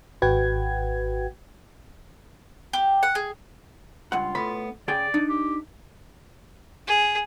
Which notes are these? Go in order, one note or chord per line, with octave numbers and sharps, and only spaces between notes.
G#1 F#4 B4 F#5 G5 G#6
G4
F#5
G#4
C#2 G2 F4 F#5
A2 B3 B5
C#3 G#4 D5 G5
D4 D#4
G4
G#4